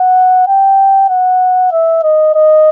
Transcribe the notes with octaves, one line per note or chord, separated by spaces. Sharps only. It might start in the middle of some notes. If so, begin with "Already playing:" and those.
Already playing: F#5
G5
F#5
E5
D#5
D#5